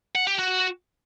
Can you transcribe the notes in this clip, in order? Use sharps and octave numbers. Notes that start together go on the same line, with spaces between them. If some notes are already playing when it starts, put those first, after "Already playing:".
F#5
G4
F#4